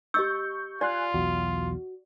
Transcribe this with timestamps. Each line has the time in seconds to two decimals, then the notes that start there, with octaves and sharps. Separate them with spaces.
0.14 G4 D#5 C#6 E6 G6
0.81 F4 D5 G#5 C6 F#6
1.14 B1 E2 F#4